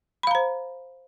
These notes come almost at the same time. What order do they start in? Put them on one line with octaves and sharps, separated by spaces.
B5 F5 A#5 C5